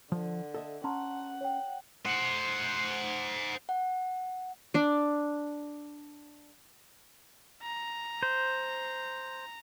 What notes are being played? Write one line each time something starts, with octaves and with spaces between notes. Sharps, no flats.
D3 F3
A4 D#5 E5
C#4 F#5 A5 A#5 C6
C#5 G5
C5 F#5
F#5
D4 D5
A#5
C5